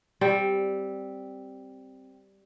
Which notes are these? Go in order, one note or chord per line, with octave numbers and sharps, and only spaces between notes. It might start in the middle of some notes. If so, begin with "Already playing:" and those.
G3 C4